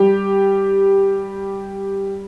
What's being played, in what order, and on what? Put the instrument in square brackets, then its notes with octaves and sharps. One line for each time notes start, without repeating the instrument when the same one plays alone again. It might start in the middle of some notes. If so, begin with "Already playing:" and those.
Already playing: [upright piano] G3 G4